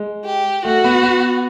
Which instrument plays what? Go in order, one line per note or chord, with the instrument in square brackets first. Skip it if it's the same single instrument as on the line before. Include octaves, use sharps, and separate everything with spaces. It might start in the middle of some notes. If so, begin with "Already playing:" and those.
Already playing: [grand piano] G#3
[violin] G4
[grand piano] A3 [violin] F#4
[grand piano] B3
B3